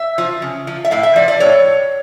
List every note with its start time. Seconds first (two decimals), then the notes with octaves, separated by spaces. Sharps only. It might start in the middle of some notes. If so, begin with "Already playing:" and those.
Already playing: E5
0.18 F3
0.42 C#3
0.67 F3
0.84 E5
0.91 A2 F5
1.03 E5
1.16 F3 D5
1.28 D5
1.40 A2 C#5